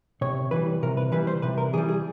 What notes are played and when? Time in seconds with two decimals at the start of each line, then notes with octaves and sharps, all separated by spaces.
0.21 C3 C#5
0.51 E3 G3 B4
0.83 C3 A#4
0.97 B4
1.12 E3 G3 B4
1.27 C5
1.42 C3 B4
1.58 A#4
1.73 E3 G#4
1.78 G3
1.88 G#4